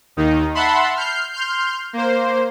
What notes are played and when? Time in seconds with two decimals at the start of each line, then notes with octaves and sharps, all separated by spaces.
0.17 D#2 D#3 D#4
0.55 E5 F#5 A5 B5 C6
0.96 F6 G6 C7
1.33 C6 F6 G6
1.93 A#3 C5